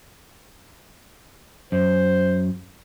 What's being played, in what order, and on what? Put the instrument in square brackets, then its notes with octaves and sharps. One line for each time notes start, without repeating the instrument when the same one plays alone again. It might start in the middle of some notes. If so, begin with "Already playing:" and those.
[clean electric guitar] F#2 [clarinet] C5